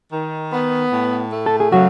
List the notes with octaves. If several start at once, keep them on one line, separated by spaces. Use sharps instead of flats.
D#3
B3
A2
A3
A4
G#4
C#3 F#3 F#4